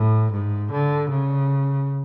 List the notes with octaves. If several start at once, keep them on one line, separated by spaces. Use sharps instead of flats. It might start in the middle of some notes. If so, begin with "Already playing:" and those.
Already playing: A2
G#2
D3
C#3